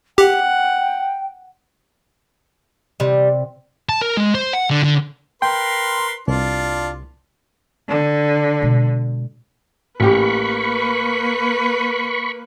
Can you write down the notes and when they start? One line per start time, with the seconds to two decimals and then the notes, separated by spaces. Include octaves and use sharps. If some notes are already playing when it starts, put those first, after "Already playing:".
0.18 G4 F#5 G5
3.00 C3 G3
3.89 A5
4.02 A#4
4.17 G#3
4.35 C5
4.53 F#5
4.70 D3
4.83 D3
5.42 A#4 B4 G5 C6
6.28 C2 D4 F4
7.89 D3
8.62 B2 G#3
10.00 A1 A#3 G4 B4 B5 C#6